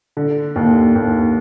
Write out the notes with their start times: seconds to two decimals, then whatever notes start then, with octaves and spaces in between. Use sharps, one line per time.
0.17 D3
0.56 D#2
0.95 D#2